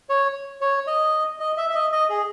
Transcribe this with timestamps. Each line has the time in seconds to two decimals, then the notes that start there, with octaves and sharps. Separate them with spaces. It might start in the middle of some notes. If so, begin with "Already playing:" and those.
0.09 C#5
0.61 C#5
0.87 D#5
1.40 D#5
1.57 E5
1.70 E5
1.75 D#5
1.92 D#5
2.10 G#4